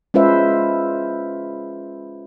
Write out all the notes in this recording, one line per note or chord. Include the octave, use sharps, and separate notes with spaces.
G#3 C#4 F4 B4 C5 E5